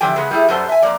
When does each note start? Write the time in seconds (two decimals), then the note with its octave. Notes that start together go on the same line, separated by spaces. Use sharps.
0.01 E2 D3 F3 G4 G5 G#5
0.16 C#3 G#3 B3
0.31 G3 A3 E4 G#4
0.49 F#2 G3 B3 A4 C5 A5
0.69 E5 G#5
0.82 F2 A#3 D5